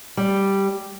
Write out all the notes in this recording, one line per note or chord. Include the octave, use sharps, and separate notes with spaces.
G3